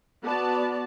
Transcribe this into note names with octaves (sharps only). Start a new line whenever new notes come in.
B3 F#4 D5 A5